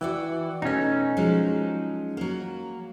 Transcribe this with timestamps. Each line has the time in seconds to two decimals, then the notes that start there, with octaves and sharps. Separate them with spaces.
0.01 E3 F#4 D5 G5
0.62 B2 A3 C#4 D#4
1.17 F3 F#3 G#3
2.17 F#3 A#3